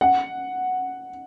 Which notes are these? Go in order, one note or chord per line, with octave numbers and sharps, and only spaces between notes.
F#5